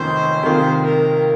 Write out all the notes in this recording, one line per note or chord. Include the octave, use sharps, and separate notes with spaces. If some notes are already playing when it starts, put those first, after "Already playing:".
Already playing: F1 F2 D#3 A#3 C#4 C5
C3 D#3 A#3 F4
A#4